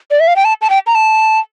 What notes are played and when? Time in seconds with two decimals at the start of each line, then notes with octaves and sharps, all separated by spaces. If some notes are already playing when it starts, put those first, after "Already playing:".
0.11 D5
0.20 E5
0.28 F5
0.36 G5
0.45 A5
0.62 A5
0.70 G5
0.87 A#5
0.95 A5